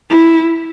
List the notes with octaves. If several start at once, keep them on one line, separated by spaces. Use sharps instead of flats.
E4